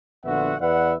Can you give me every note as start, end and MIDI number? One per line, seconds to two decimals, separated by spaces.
0.25 0.55 34
0.25 0.55 50
0.25 0.55 59
0.25 0.55 66
0.25 0.55 76
0.25 0.55 78
0.61 0.94 40
0.61 0.94 71
0.61 0.94 74
0.61 0.94 76
0.61 0.94 78